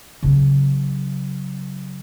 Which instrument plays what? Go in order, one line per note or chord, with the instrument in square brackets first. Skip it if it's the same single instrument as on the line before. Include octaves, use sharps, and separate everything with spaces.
[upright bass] C#3 F#3